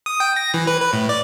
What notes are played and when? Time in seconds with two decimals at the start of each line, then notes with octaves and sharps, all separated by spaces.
0.06 D#6
0.20 G5
0.36 A#6
0.54 E3
0.67 B4
0.81 B4
0.93 A2
1.09 D5